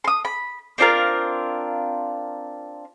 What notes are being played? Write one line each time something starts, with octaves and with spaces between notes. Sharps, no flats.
C6 D#6
B5
C4 D4 F4 A#4